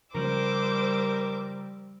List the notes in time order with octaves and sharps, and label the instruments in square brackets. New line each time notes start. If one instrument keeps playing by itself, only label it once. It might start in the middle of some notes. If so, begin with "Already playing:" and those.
[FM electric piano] C#3 F3 [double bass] G3 C4 [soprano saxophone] A#4 [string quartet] C5 D6 E6